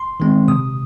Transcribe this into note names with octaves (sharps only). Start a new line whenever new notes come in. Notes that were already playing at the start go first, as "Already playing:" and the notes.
Already playing: C6
D#3 G#3 C4
C3 D#6